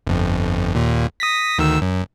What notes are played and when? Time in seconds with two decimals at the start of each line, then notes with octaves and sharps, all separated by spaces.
0.07 G1 F2
0.75 D#2 A#2
1.20 D#6 A#6 B6
1.58 D2 D#3 E6
1.82 F#2